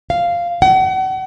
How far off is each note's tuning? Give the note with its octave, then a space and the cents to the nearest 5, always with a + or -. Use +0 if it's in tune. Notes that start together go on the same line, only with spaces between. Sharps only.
F5 -10
F#5 +40